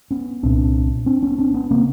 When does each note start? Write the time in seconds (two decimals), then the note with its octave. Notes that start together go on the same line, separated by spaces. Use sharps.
0.11 B3 C#4
0.43 C2 A#2 C4 D4
1.06 C4 D4
1.22 B3 C#4
1.38 C4 D4
1.54 B3 C#4
1.71 C#3 A#3 C4